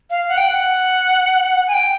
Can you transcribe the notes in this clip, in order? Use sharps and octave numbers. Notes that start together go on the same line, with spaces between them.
F5
F#5
G5
F#5
G#5
G5